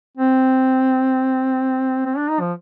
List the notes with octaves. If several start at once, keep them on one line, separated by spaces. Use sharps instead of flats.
C4
C4
D4
D#4
F3